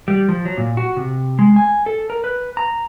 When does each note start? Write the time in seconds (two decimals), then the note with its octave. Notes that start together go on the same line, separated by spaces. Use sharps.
0.08 G3
0.29 F3
0.45 F#3
0.57 A#2
0.77 F#4
0.97 C3
1.39 G#3
1.56 G#5
1.86 A4
2.10 A#4
2.24 B4
2.57 A#5